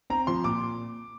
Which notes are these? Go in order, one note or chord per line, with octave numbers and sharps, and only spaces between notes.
C4 A#5
F3 C6
A#2 D6
A#2